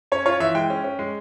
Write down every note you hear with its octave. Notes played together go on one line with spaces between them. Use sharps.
C#4 C#5
F4 C#5
E3 E5
G#3 G5
C#4
C#4
G#3